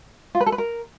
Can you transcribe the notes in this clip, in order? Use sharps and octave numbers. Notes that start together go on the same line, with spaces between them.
F4
B4
A4
B4
A#4